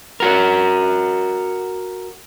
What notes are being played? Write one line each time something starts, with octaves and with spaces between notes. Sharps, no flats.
F#4 A#4